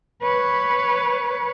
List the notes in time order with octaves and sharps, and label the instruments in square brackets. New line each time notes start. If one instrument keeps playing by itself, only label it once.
[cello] B4 C#5